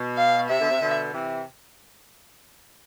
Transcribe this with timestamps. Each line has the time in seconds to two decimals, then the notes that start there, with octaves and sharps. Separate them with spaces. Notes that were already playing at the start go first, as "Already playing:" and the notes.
Already playing: B2
0.17 F5
0.49 C3 E5
0.60 B2 D3
0.71 C3
0.81 B2 D3
1.13 C3 E3